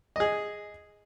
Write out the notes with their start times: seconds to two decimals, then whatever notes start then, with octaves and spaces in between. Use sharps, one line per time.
0.16 G#4 D#5